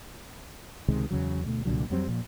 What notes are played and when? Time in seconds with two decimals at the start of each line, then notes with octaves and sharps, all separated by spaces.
0.88 C#2 C3 D#3 G#3
1.11 E2 C#3 F#3
1.45 D2 B2 A3
1.65 C2 A#2 D3 F#3
1.90 F2 F#3 G3 C4
2.08 A#2 F3